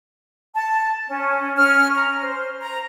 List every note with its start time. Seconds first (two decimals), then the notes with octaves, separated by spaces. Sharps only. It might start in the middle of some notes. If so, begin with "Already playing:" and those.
0.56 A5
1.08 C#4
1.56 C#4 F6
1.96 A#5
2.22 C5
2.61 A#5